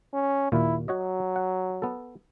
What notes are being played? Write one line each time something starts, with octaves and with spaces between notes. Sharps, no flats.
C#4
D#2 A#2 E4 F4
F#3 F#4 C#5 D#5
F#5
B3 A4